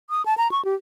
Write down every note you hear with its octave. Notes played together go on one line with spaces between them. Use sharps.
D#6
A5
A#5
C#6
G4